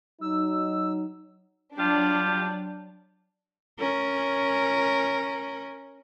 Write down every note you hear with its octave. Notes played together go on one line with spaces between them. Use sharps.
F#3 D#4 E6
F#3 G3 D4 F4 G4
C#4 A#4